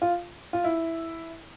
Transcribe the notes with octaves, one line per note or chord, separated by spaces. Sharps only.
F4
F4
E4